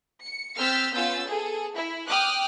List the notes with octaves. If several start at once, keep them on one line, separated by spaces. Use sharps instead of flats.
C#7
C4 E6 F6 G6 A6 B6
B3 C#4 F4 E6 G6 A6
G#4 A4
E4
G5 D6 D#6 F6 F#6